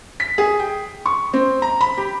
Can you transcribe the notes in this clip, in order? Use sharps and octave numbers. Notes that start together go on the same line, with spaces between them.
B6
G#4
G5
C#6
C4
A#5
B5
G4